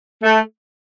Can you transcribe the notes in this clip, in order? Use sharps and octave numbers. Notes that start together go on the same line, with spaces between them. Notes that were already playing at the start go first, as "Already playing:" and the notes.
A3